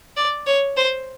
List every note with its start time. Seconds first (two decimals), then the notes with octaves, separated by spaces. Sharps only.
0.17 D5
0.46 C#5
0.77 C5